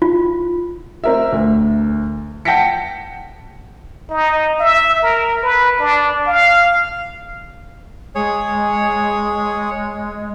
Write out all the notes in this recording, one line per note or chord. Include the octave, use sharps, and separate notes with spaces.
F4
C4 A#4 E5
D2
F#5 G5 A5 A#6 B6 C#7
D#4
E5
A#4
B4
D4
F5
G#3 G#4 C#5